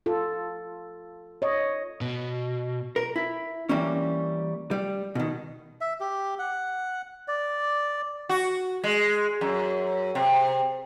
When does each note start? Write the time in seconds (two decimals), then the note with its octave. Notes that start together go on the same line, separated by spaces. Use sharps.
0.06 F4 A4
1.42 C#5 D#5
2.01 B2
2.96 A#4
3.16 E4
3.69 E3 G3 A#3 C#4
4.71 G3
5.15 B2 D#3
5.81 E5
6.00 G4
6.39 F#5
7.28 D5
8.29 F#4
8.84 G#3
9.41 F#2
10.15 C3